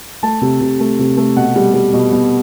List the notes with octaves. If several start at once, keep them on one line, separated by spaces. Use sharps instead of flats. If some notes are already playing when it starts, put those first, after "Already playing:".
A3 A5
C3
C3
A3
C3
A3
B2 F#5
G3
G3
B2
B2